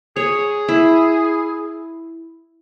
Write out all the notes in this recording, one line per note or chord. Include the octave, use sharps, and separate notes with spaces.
G#4 C#5
E4